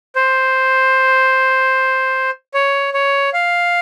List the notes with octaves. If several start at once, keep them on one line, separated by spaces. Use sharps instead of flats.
C5
C#5
C#5
F5